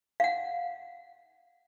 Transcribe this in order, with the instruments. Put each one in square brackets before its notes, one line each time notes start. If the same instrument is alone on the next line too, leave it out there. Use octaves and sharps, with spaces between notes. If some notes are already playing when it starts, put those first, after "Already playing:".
[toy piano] F5 F#5